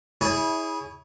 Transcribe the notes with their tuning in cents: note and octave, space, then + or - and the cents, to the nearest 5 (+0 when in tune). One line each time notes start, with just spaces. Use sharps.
E4 -25 G#4 +0 C#5 +20